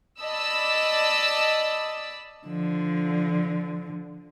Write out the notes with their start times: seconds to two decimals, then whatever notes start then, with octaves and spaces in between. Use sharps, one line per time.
0.21 D5 D#5 A5 B5 E6
2.47 D3 F3